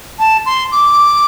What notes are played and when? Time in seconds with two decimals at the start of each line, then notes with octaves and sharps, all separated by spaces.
0.19 A5
0.46 C6
0.72 D6